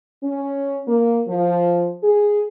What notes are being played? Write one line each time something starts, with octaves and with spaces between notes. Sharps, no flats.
C#4
A#3
F3
G#4